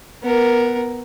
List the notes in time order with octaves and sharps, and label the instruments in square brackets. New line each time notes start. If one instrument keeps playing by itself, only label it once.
[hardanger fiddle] B3 A#4